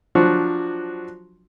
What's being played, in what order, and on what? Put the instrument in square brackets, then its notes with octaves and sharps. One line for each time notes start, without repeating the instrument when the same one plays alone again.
[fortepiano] F3 F#3 D4 F#4